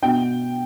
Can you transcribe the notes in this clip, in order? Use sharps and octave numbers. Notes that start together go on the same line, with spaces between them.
B2 G5